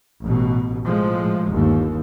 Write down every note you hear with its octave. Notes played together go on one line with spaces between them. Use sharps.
A1 B2
A2 F3 G#3
G1 D#2